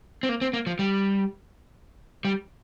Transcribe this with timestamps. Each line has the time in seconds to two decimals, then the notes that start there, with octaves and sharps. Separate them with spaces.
0.23 C4
0.29 A#3
0.41 C4
0.53 A#3
0.67 F3
0.79 G3
2.25 G3